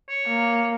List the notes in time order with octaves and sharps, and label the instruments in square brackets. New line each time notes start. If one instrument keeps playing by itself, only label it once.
[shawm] C#5
[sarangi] A#3